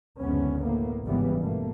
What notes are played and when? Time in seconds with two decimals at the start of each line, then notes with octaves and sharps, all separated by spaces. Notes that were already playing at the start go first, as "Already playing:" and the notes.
0.20 F#1 D2 G#2 B3 C#4
0.61 A2 A#3 B3
1.05 G#1 G#2 C#3 E3 G3 B3
1.39 G2 B2 A3 A#3